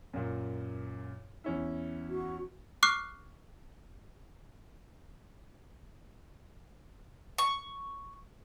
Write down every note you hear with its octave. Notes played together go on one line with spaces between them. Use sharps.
F#2 A#2
E2 C#4 E4
F#4
C#6 D6 F6 F#6 C7
C#6